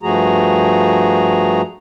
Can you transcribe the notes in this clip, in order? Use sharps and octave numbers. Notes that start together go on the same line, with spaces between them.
G2 F3 A3 F#4 G#4 A#5